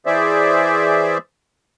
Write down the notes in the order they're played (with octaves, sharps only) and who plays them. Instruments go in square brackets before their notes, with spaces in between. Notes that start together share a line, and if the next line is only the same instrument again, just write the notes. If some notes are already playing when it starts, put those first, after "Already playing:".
[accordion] E3 G#4 C5 D5 E5